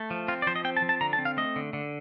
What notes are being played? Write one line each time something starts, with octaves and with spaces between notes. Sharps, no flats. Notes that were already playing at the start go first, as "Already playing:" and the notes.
Already playing: A3
F3
C4 F4
D5
F3 C5
D#5
C4 G5
A5
F3
A5
D3 A#5
A5
C4
F5
A3 D#5
D3
D3